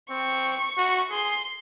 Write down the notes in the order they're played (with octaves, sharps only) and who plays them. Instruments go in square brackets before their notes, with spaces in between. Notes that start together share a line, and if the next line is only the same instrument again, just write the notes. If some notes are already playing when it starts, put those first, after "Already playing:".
[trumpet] C4 [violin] C#6
[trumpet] F#4
[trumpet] G#4 [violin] C6